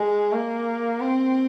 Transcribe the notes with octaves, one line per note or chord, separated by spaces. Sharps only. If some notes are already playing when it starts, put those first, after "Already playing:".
Already playing: G#3
A#3
C4